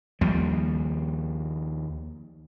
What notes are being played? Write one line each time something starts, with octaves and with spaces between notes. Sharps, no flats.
D#2 F3 G3